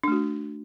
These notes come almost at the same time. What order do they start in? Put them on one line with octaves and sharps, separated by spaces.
D4 A3 F#4